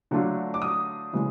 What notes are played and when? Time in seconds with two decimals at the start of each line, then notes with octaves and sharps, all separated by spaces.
0.11 D3 F#3 A3 D4 F4
0.54 D6
0.62 D#6
1.13 C#3 E3 G#3